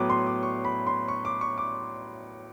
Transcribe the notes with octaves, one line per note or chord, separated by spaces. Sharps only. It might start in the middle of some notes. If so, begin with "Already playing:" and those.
Already playing: A2 F#3 B3 D6
C6
D6
C#6
B5
C6
C#6
D6
C#6
D6